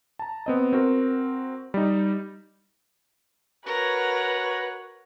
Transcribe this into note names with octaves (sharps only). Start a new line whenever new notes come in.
A5 A#5
B3 C4 D#5
C4 F#4 A#4
G3 D#4
F#4 A#4 B4 C#5